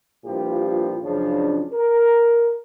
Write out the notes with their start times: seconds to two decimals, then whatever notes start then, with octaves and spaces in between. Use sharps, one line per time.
0.25 G2 A#2 F3 E4 F4 G4
1.03 F#2 C#3 F3 D4
1.73 A#4